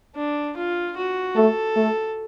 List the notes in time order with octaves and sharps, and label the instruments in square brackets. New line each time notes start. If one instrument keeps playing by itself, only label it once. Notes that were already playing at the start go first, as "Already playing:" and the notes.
[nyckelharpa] D4
F4
F#4
[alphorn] A3 [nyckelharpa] A4
[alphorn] A3